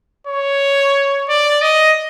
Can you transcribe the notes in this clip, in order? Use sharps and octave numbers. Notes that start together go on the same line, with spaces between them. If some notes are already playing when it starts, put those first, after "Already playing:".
C#5
D5
D#5